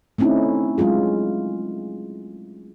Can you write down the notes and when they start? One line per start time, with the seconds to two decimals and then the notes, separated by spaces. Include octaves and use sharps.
0.18 A3 C4 C#4 D#4 E4
0.78 F#3 G#3 C#4 F4 G#4